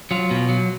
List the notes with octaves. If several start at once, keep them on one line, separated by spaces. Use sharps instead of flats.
F#3 F4
B2
F#3